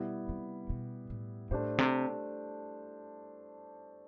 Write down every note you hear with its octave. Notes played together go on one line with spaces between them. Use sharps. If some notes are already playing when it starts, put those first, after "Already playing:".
Already playing: B2 G3 B3 E4
C3
B2
A2
A2 A3 D4 G4 C5
C3